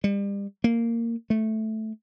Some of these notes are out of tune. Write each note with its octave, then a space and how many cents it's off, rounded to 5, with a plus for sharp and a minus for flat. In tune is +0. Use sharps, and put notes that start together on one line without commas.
G3 +35
A#3 -10
A3 -5